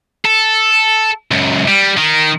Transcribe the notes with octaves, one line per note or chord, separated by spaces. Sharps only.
A4
C#2 F#2
G3
D#3